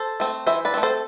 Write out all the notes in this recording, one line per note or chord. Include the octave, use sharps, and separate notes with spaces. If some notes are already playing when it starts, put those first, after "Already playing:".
Already playing: A4 C5
A3 C4
E3 C5 E5
B4 D5
A3 C4
A4 C5